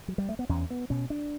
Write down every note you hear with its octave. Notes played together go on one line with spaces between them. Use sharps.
F#3
G3
A3
B3
E2 C#4
B3
B2 C#4
D4